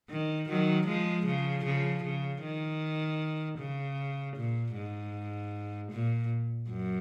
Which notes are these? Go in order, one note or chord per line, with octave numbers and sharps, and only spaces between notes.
D#3
D#3 F#3
F3 G#3
C#3 F3
C#3 F3
C#3
D#3
C#3
A#2
G#2
A#2
F#2